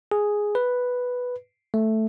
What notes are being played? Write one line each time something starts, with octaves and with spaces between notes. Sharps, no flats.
G#4
B4
A3